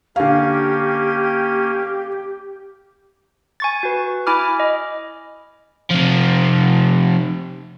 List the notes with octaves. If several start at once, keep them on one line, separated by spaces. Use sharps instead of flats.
D3 A#3 C#4 G4 F5
G#5 C#6 A6
F#4 B4
E4 G#5 B5 D6 F6
D#5
C3 F3